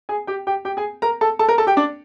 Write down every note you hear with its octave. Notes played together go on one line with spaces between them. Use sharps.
G#4 G#5
G4 G5
G4 G5
G4 G5
G#4 G#5
A#4 A#5
A4 A5
A4 A5
A#4 A#5
A4 A5
G4 G5
D4 D5